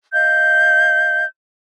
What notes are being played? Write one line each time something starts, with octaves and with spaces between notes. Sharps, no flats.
D#5 F5 G6